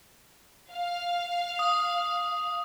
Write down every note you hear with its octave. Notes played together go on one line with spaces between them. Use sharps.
F5
D#6